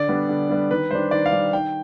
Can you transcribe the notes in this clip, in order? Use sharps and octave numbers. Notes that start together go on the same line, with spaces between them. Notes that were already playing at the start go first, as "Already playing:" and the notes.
Already playing: D3 D5
G3 B3 D4
D3
G3 B3 D4
D#3 B4
G3 D4 C5
D#3 D5
F5
G3 D4
D#3 G5